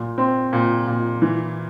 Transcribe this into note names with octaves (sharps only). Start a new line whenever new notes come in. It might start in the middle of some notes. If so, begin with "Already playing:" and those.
Already playing: A#2
C4
A#2
A#2
E3